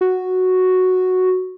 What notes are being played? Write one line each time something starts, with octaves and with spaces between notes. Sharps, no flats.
F#4